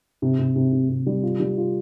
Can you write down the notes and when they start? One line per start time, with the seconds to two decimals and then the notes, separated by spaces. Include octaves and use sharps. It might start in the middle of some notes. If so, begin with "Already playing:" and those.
0.22 C3
0.39 C3
0.56 C3
0.72 C3
0.89 C3
1.06 G3
1.23 F4
1.40 G3
1.57 F4